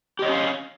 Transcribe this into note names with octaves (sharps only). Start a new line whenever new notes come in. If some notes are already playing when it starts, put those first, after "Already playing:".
C#4 G4 C#5 D#5 F5